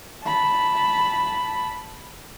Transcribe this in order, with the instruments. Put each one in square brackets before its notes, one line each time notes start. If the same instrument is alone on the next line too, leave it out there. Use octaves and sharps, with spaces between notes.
[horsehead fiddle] A5 B5